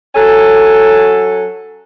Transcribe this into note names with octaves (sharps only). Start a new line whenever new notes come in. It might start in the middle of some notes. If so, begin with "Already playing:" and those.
F#3 C#4 A4